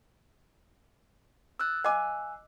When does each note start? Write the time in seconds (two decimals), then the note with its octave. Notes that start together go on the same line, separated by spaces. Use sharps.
1.59 D5 D#6 E6 F#6
1.84 D#5 F5 G#5 D6